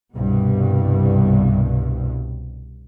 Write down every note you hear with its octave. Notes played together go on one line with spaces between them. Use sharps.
C2 G2 B2